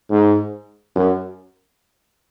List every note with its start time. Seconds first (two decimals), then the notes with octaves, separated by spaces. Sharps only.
0.10 G#2
0.95 F#2